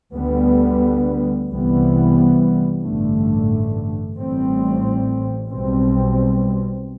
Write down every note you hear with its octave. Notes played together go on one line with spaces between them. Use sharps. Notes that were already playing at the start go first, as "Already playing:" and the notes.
D2 D3 G3 B3
C2 C3 E3 G3 B3
A1 G2 D3 A3
A1 A2 G3 C4
B1 B2 G3 C4